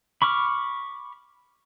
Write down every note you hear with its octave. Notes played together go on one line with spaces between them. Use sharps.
B5 C#6 D6 F6